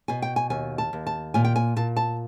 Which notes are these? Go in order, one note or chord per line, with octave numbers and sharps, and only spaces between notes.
B2 G#5
G5
G#5
D#2 G#5
A5
D#2
A5
A#2 G#5
G5
G#5
A#2 A5
A5